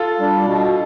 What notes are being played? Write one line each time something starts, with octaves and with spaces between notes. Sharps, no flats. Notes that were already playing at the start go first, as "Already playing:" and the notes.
Already playing: F4 A4
G3 D4
B2